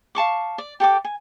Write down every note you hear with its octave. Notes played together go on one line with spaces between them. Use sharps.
F5 A5 C#6 D6
D5
G4 A4 G5 D6
G#5